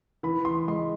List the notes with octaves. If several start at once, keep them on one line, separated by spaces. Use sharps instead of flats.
E3 B5
C6
G#3 C6